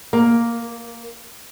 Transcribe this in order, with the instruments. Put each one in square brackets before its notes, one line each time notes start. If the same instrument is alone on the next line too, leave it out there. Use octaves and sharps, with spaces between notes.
[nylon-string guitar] A#3